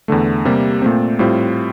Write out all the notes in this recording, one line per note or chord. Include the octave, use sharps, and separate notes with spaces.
E2 D3 A3
C3 G3 A#3
A#2 A3 C4
A2 G3 C4 F4